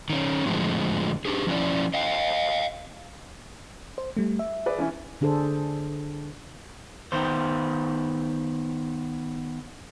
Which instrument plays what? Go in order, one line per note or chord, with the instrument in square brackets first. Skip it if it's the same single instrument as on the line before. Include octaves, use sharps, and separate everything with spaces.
[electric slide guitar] D#3 C#4
F2 A2 D3 F3 G#3 C4
D4 G4 G#4
F3 C#4 E4 D5
D#5 F5 G5
[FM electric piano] C5
G3 A3
E5
[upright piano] G#4 B4 D5
E3 C#4 E4
[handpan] D3 D4 G#4 A4 C5
[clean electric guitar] D#3 B3 C5